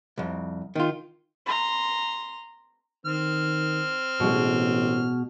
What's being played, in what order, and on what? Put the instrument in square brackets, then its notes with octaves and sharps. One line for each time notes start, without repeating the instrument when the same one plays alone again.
[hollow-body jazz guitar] C2 F2
D#3 F4
[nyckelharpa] A#5 C6
[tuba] D#3 [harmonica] C4 F6
[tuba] A1 [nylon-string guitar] B2 G#3